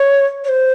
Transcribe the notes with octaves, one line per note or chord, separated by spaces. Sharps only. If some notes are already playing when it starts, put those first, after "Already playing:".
Already playing: C#5
C#5
C5